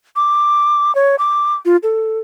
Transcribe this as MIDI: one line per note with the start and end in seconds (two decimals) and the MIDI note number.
0.16 0.94 86
0.95 1.16 73
1.19 1.55 86
1.65 1.77 65
1.83 2.18 69